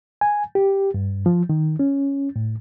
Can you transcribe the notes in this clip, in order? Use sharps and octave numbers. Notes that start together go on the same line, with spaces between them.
G#5
G4
G2
F3
D#3
C#4
A2